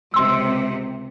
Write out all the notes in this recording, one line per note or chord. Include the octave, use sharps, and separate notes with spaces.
C#2 C3 C6 E6